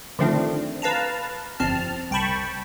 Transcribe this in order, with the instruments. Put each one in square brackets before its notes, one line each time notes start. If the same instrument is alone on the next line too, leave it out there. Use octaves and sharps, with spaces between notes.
[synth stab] D3 D#3 F3 A3 C4 D4
B4 F5 A5 A#5
G1 F2 C4 A5 F6
C2 G5 A5 B5 C#6